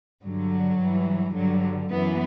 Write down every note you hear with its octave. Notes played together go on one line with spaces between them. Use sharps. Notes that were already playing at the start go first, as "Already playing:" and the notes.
G2 D3 F#3
G2 E3
G2 D3 F#3
F#2 E3 B3